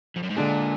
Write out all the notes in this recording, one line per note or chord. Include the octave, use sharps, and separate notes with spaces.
F2
F#2
G#2
A#2 D3 G#3 D4 G#4